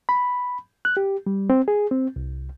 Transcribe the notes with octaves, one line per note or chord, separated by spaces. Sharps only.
B5
F#6
G4
G3
C4
G#4
C4
C2